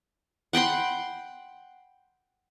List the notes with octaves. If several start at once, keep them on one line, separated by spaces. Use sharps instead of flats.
F#5 G5 B5 C6